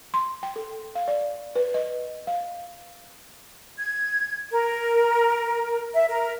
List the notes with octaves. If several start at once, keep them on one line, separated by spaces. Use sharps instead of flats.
C6
G5
A4
F5
D5
B4
D#5
F5
G#6
A#4
E5
A#4